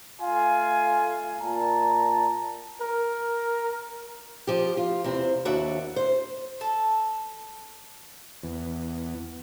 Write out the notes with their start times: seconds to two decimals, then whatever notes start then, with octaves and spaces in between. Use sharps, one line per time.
0.20 A3 F4 F5 G#5
1.40 A#2 A5 A#5
2.81 A#4
4.47 F3 G4
4.77 F4
5.04 E2 C3 C4
5.45 D#2 D4 F#4 E5
5.96 C5
6.61 A4
8.44 E2